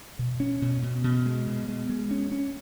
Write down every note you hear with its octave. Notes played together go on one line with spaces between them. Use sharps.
B2
C#4
B2
B2
B2
G#3
B2
G#3
G#3
C#4
C#4